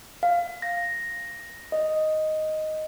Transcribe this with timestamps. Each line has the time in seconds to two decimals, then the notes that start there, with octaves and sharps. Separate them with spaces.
0.23 F5
0.62 A#6
1.72 D#5